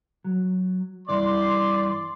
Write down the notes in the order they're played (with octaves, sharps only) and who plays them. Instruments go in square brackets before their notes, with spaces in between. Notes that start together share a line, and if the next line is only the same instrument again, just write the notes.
[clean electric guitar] F#3
[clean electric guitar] G2 E3 [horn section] D5 C6